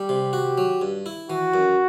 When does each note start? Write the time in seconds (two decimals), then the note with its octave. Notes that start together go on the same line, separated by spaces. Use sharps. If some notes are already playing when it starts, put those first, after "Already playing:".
Already playing: G3 G4
0.09 C3
0.33 F#4
0.58 F#3
0.82 G2
1.06 E4
1.30 E3 F#4
1.54 F#2